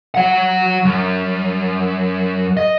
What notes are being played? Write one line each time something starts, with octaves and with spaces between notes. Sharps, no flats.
F#3 F#5
F#2
D#5